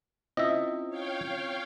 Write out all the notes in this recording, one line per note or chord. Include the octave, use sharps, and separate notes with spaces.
C4 C#4 E4 F4 D#5 E5
C#5 F5 G5